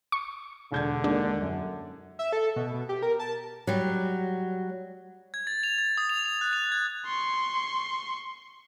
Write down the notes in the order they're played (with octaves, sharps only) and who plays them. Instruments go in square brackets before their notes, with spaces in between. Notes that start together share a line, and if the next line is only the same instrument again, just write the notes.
[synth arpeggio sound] C#6
[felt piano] E1 G6 G#6 [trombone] D3
[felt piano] D#2 G#3 A#3 [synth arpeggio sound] D4
[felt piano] F#2
[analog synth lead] E5
A4
B2
B2
G4
A#4
A5
[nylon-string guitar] F#3 G3
[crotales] G#6
A6
F7
A6
D#6
F7
F7
F#6
F7
G#6
[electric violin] C6 C#6